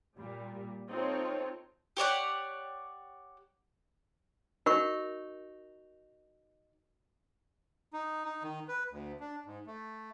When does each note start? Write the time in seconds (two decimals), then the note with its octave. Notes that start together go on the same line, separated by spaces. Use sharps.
0.17 A#2 G3
0.89 C4 D#4 F4 A4 C#5
1.97 G4 C#5 D5 F#5
4.66 D#4 F#4 A#4 C#6
7.93 D#4
8.25 D#4
8.43 D#3
8.68 B4
8.91 D2
9.20 D4
9.46 G#2
9.67 A3